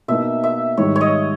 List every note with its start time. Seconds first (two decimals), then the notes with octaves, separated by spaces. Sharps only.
0.08 B2 A#3 D#4 E5
0.44 E5
0.77 G#2 D#3 G3 C#5
0.96 C#5
1.01 D#5